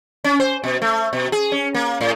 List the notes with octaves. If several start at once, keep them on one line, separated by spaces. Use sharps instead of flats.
C#4
C5
B2
A3
B2
G#4
C#4
A#3
A2